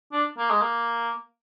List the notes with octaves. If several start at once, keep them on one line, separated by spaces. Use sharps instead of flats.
D4
A#3
G#3
A#3